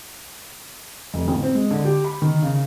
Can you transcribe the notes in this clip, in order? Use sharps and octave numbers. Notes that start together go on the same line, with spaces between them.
F1
A1
C4
G#3
D3
G4
B5
D#3
C#3